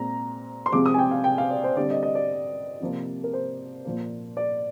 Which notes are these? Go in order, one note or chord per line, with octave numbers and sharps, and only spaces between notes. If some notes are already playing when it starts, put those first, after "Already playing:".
Already playing: A#2 G#3 C4 A#5
C6
C3 F3 G#3 C4 D6
D#6
G#5
G5
F5
G5
F5
D5
C5
D3 G3 C4 D5
D#5
D#5
D5
C3 F3 A#3
A#4
C5
A#2 F3 A#3
D5